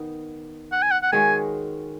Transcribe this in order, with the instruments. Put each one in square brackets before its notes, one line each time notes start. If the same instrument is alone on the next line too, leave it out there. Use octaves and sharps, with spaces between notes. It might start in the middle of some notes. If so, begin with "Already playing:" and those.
Already playing: [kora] D#3 B3 D#4
[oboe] F#5
G#5
F#5
F#5
[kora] D#3 G#3 C#4 F#4 [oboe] G#5